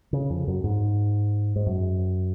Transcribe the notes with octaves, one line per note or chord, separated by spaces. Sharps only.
C#3
F2
F#2
G#2
G#2
F#2